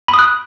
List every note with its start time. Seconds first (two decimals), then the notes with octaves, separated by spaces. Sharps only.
0.08 B5
0.14 D#6
0.19 F#6